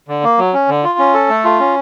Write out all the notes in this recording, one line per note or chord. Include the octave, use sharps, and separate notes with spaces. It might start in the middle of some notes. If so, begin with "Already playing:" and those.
D3
A#3
F#3
C#4
D3
F4
C#4
A4
A3
F4
C#4